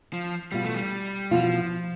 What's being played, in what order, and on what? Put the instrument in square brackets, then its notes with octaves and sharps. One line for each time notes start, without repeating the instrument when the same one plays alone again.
[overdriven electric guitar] F3
[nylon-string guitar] E2 B2 B3 F4 [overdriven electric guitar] G3
[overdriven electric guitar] A3
G3
[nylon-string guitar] E2 B2 B3 F4 [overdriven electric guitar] F3